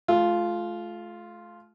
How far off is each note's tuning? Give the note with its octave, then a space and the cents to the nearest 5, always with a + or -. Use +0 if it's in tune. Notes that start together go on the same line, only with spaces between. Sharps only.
A3 -40 F4 +0